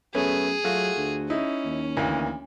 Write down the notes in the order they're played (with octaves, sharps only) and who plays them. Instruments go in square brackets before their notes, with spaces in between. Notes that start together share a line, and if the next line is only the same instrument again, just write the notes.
[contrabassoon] F#2 [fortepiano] A3 B3 C#4 [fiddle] G#4
[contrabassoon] F#3 [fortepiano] A3 F4 F#4
[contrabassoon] D2
[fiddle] C#4 [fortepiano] D#4 E4
[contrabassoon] D#2
[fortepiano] D2 E3 A#3